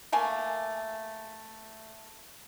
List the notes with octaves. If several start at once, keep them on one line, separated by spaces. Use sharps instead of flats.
A3 A#3 G#5